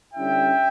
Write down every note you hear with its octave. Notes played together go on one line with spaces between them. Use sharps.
D3 G3 C#4 E4 E5 G5